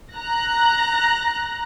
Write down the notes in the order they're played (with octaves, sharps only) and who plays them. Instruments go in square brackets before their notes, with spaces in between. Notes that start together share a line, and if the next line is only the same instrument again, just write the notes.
[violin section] A#5 F#6 A#6